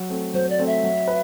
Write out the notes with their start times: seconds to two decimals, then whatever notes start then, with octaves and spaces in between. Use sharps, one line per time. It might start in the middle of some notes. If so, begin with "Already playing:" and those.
Already playing: F#3
0.09 A3 C4
0.34 F#3 C5
0.50 D5
0.59 A3 C4
0.66 E5
0.84 F#3
1.08 B4